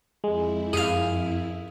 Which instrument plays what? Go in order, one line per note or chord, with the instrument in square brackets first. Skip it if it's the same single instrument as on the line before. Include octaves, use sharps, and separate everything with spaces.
[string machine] F2 E4 [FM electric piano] G#3
[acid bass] F#2 [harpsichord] G#4 F5